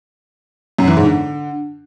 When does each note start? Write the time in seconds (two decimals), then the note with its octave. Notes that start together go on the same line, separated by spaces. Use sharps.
0.79 F#2
0.88 E3
0.97 G#2
1.06 D3